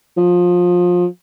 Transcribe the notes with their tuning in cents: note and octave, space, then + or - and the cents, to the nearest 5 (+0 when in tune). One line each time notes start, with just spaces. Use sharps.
F3 +25